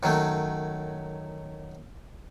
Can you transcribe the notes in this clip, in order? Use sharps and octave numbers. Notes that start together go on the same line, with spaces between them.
F#2 D#3 F#3 A3